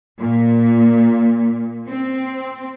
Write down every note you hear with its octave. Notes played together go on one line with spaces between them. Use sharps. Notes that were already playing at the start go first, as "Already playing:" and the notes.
A#2
C4